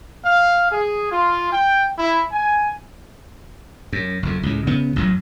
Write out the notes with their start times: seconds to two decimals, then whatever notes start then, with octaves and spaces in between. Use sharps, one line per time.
0.24 F5
0.70 G#4
1.11 F4
1.52 G5
1.97 E4
2.31 G#5
3.93 F#2
4.23 F#1 F2
4.43 C#2 A2
4.67 C#3 B3
4.96 A1 F#2 F#3